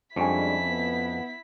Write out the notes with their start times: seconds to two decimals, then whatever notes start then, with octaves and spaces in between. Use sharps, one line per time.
0.16 F2 G3 G#3 C#4 D4 E4 G#5 B6
0.66 B3